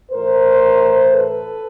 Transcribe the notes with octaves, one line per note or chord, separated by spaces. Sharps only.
A2 E3 A#4 C5
A4 B4